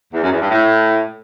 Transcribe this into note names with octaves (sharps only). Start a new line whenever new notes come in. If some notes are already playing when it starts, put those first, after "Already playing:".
E2
F#2
E2
G2
A2